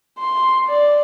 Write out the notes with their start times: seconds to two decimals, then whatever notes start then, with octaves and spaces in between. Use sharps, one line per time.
0.19 C6
0.67 D5